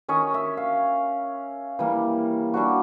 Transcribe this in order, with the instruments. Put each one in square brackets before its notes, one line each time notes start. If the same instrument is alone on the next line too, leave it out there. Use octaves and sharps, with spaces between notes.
[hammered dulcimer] D#3 C#4 D#5 C#6
E5
F5
E3 G3 A#3
G3 D4 F#4